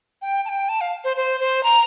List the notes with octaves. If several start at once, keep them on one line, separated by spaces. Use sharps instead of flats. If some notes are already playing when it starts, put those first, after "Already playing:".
G5
A5
G5
A5
F5
C5
C5
C5
A#5